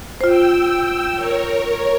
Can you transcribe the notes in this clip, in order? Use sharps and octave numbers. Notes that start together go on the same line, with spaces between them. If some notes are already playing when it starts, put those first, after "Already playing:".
F4 C5 G5 E6
A#4 C#5